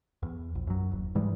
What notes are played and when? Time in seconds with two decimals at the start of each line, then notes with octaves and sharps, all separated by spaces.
0.23 E2
0.55 A#1
0.67 F#2 F#3
0.92 D#1
1.15 G#2 E3 G3 G#3